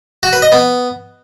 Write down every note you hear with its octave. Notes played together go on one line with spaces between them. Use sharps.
F#4
B4
D#5
B3